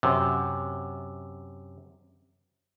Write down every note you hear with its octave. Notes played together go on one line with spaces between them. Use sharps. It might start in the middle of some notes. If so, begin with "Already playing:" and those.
F#2 C3